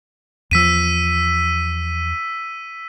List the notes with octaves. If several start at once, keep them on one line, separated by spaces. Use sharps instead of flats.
E2 F3 E6 B6 D#7